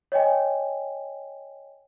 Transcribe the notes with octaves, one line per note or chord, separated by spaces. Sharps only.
C#5 D#5 G5 G#5